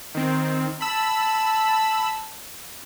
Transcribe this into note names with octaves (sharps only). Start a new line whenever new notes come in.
D#3 C4
A5 B5 E6